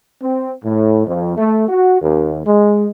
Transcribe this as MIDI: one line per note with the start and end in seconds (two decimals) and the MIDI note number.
0.22 0.53 60
0.64 1.06 45
1.07 1.33 41
1.37 1.65 57
1.69 2.01 66
2.02 2.41 39
2.46 2.88 56